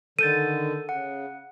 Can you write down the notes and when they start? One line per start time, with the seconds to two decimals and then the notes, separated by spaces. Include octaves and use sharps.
0.19 D3 D#3 A4 G6 A6 D#7
0.89 C#3 F#5